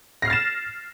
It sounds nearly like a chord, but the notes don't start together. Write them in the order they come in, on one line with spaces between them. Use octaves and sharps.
A#6 C7 F6 A6 E7